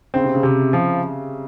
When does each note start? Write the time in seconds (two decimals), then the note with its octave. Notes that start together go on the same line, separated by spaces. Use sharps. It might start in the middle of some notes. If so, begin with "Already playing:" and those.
0.14 C#3 C4
0.24 C3
0.35 C#3
0.43 C3
0.73 F3